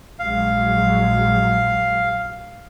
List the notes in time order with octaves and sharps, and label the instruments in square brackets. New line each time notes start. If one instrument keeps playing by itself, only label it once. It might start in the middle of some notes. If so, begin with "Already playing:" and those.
[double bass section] A#1 F#3 G#3 [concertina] F5